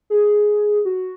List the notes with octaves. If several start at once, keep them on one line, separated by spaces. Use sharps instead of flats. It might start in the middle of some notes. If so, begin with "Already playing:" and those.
G#4
F#4